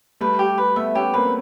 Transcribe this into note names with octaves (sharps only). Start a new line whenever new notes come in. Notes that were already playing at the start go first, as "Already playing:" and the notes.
G3 A3 B4
G4
B4
A3 B3 E5
B3 C#4 G4
A#3 C4 B4